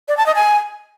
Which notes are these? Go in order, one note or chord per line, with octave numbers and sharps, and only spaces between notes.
D5
A5
D#5
G#5